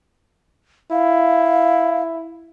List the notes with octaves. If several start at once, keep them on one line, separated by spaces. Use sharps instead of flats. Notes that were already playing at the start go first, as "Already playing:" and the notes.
E4 F5